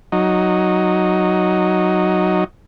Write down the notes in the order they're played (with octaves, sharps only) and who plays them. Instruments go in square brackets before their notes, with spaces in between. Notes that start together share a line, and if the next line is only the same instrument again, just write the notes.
[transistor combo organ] F#3 D#4